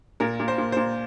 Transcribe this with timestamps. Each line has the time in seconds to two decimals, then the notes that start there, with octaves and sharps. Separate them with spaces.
0.20 A#2 A#4
0.40 A#2
0.48 C5
0.58 A#2
0.72 A#2 C5